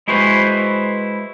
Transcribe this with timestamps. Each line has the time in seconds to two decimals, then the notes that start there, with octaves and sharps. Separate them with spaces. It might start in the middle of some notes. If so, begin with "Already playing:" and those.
0.08 G#3 E4 F#4 B4 C5